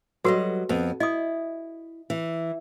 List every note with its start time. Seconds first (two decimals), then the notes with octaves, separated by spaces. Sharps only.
0.24 F#3 G3 F#4 A4 B4 D#5
0.69 F2 B3
1.00 E4 D#5 D#6
2.10 E3